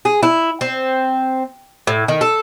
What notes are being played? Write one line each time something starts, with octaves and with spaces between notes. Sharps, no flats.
G#4
E4
C4
A2
D#3
A4